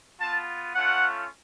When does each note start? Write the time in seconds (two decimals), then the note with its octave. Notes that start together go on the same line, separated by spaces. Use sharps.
0.20 B3 F4 A5
0.74 A3 C#4 F4 F#5